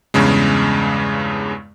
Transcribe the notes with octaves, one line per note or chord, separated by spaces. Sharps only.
E2 G2 C#3 G#3